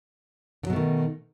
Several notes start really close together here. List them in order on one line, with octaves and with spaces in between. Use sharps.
D3 F#3 B2 A3 D#3